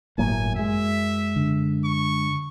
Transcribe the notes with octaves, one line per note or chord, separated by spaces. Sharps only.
G1 A2 F#3 A#3 G#5
F#2 G#3 E5
D3
C#6